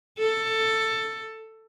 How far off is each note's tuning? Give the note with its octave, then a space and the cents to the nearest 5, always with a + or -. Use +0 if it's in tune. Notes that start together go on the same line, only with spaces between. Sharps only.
A4 +15